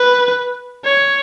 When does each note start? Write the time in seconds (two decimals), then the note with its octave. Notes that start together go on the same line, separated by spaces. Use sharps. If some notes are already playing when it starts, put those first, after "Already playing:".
Already playing: B4
0.85 C#5